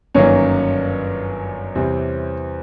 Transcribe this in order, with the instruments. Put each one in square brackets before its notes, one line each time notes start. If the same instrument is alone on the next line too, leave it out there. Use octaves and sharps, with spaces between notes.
[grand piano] G1 F#2 D#3 F#3 A#3 [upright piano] C#4
[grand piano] E2 C3 E3 G3 C4